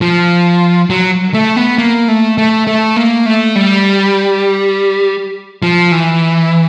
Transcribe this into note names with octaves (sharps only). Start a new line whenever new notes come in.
F3
F#3
A3
B3
A#3
A3
A3
A3
A#3
A3
G3
F3
E3